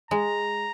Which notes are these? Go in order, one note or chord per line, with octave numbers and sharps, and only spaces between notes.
G#3 A#5